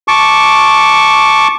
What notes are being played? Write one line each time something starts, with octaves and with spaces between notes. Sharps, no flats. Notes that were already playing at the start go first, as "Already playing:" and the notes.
A5 C#6 D6